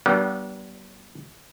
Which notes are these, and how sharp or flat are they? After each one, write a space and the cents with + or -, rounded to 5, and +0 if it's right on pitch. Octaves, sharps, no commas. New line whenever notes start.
G3 -40 B3 -40 D4 +0